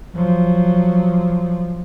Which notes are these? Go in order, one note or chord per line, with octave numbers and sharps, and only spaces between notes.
F3 F#3